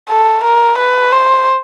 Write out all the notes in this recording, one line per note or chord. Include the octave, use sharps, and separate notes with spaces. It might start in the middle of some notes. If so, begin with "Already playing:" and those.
A4
A#4
B4
C5